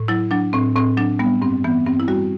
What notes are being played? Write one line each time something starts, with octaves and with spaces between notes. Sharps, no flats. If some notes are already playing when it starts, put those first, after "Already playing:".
Already playing: A2
F#3 E4
F#3 D4
A2 C4
A2 C4
F#3 D4
G3 B3
G2 C4
E3 B3
G2 C4
E4
G3 F#4